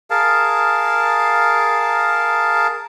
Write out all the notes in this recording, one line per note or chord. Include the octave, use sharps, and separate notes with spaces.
G#4 A#4 F5 A5